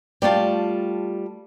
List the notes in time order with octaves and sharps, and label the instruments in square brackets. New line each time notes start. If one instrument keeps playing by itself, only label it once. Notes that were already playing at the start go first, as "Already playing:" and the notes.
[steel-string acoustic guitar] G3 A3 F4 A5